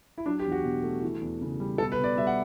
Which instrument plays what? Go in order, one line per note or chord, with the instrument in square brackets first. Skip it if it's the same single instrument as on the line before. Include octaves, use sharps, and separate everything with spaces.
[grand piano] E4
F#3 D4
G4
E2
F#4
B2
A3
E3
E2
C#3
G3
B2 A4
B4
B2
D5
G3 E5
F#5